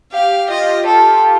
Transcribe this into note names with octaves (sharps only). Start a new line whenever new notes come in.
G4 F5
F4 D#5
A4